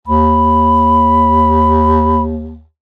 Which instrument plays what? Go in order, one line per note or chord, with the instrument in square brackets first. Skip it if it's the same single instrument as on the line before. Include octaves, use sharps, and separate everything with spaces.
[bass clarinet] D#2 [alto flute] B5